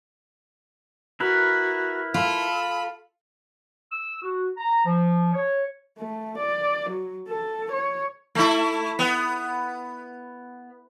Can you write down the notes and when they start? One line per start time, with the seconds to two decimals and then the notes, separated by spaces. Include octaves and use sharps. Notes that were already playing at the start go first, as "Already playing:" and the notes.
1.20 E4 F#4 A#4 B4
2.14 F4 A4 B5
3.91 E6
4.22 F#4
4.58 A#5
4.85 F3
5.33 C#5
5.98 A3
6.38 D5
6.90 F#3
7.28 A4
7.72 C#5
8.35 A3 E4
8.99 B3